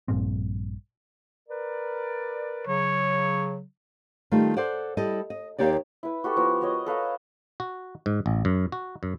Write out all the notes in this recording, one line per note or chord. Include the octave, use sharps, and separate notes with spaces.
A#1 G2 A#2 C4
A#4 B4 D5
C#3 F#3 C#5
D#3 G3 A3 F4
A4 C5 D5 F#5
G3 E4 A4 D#5
D#5
D#2 A#3 G4 C#5 D5
E4 B4
F#4 G4 A4 B4
F3 B3 A#5
F#4 A#4 C#5 D#5
A4 B4 F5 A#5
F#4
G#2
A1
F#2
F#4
F#2